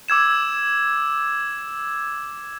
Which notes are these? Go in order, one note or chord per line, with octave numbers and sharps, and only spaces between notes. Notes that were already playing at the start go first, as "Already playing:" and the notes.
D6 E6 G#6 E7